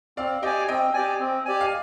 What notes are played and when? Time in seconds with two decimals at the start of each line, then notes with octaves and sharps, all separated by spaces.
0.17 C4 D5 F5
0.43 G4 D5 D#5 G5 G#5
0.68 C4 D#5 G5
0.93 G4 D5 G#5
1.20 C4
1.45 G4 D5 G#5
1.61 F5